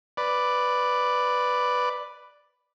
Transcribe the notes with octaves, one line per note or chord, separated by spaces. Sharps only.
B4 D5